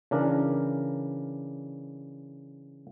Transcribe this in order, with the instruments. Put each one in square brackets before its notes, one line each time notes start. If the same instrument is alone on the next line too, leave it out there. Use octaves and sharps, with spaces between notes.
[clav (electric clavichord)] C#3 E3 D4 A#4